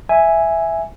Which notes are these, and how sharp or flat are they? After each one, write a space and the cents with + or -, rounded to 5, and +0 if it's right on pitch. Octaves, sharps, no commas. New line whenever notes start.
E5 +0 G#5 +0